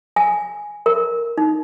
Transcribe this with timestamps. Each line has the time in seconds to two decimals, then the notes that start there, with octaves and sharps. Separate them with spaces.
0.16 G#5
0.86 A#4
1.38 D#4